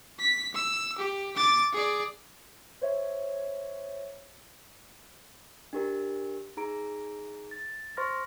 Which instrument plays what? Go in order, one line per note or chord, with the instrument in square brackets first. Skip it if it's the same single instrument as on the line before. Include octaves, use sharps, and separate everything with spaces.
[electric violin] B6
E6
G4
D6 A6
G#4 D5
[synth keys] C5 C#5 E5
[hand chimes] D4 G4 A#4
D#4 G#4 A#5 D7
A6
C5 C6 C#6 F6 A#6